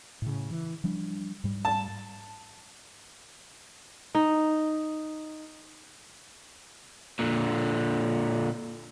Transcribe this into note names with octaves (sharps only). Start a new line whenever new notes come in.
A2 C#3
E3
F3 G3 D4
G#2 G3
A5
D#4
A#2 D3